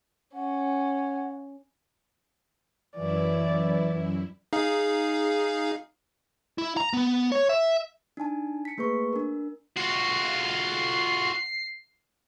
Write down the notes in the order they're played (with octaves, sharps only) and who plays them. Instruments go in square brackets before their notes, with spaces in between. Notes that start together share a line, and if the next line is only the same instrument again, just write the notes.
[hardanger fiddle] C#4 [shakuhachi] F#5
[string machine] F#2 E4 [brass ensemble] E3 [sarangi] D5
[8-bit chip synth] D#4 G#4 F5
[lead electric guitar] E4
A#5
B3
C#5
E5
[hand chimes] D4 D#4 G#5 A5
B6 C#7
A3 A#3 G#4 B4 C#6
D4 A#4
[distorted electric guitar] F4 F#4 [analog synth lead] C7